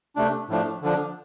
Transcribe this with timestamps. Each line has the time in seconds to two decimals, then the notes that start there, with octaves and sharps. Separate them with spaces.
0.16 C3 A3 D4
0.49 A2 F3 A3 D4
0.82 D3 F3 D4